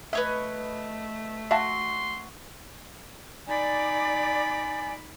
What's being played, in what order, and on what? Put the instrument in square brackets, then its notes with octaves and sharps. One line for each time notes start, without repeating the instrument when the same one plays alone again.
[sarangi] A3 [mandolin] B4 C#5 D#5 [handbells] E5
[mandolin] F#4 [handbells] E5 F5 A5 [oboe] C6
[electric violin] D#4 B5 [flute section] D5 [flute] G#5